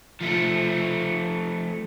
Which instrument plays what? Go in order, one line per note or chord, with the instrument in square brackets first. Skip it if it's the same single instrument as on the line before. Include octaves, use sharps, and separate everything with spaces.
[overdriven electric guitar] F3 A3